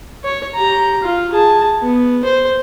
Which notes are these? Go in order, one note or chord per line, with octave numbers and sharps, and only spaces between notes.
C#5
G4 A#5
F4
G#4 A5
B3
C5